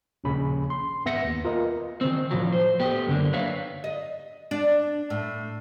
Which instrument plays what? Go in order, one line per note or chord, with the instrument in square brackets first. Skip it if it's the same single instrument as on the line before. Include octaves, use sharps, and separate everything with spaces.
[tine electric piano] A#1 D#2 C#3 C#4 B5
C6
G#1 B3 E5 A#6 C#7
D#2
F4 A#4 B4 D#5
[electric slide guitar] D#3 C4
A2 F3 F#3
C5
A3 B3 G4
F#2 D3 A#3 D4
D#4 B4 C#5 E5 F5
[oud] D#5
D4
A2